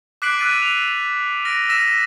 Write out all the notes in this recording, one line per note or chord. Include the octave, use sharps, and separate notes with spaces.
D6 F#6 B6 C7 D7 F#7
E6 F#6 A6 D7 D#7
F7
F6 A#6 D7
E6 A#6 B6 E7